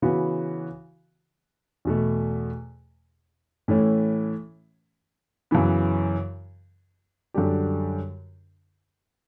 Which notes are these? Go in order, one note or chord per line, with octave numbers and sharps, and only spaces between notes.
C#3 E3 B3 F#4
E2 B2 A3
A2 E3 A3 C#4
F#2 C#3 E3 B3
F#2 D3 G3 D4 G4